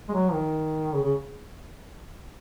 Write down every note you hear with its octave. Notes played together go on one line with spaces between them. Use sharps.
G#3
F#3
D#3
C#3
C#3